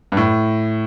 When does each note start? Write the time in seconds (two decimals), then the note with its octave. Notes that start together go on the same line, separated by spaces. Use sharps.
0.12 G2
0.17 A2